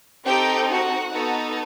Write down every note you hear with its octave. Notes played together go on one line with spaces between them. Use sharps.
C4 D#4 G4 A4 G5
F#4 F#5
B3 D#4 F#4 A4